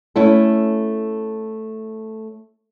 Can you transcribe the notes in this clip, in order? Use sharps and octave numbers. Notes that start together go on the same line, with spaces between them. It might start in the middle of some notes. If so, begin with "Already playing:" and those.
A3 C#4 E4 A4